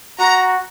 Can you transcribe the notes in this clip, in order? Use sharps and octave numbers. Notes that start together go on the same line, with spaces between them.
F#4 A#5